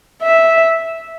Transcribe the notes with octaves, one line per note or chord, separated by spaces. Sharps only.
E5